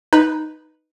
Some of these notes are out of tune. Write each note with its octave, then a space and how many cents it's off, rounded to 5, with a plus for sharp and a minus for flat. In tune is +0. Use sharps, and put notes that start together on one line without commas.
D#4 +0 B4 +0